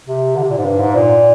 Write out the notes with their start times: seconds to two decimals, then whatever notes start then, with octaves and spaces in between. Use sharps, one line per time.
0.08 C3
0.36 D3
0.43 C3
0.51 A#2
0.58 G#2
0.65 G2
0.80 G#2
0.95 A#2